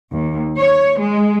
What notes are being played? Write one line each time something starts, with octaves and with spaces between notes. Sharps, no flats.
D#2
C#5
G#3